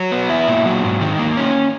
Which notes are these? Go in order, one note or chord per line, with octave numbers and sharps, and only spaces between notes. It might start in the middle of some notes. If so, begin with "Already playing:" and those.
Already playing: F#3
B3
E4
A#2
F#3
G#2
D#3
A#3
C#4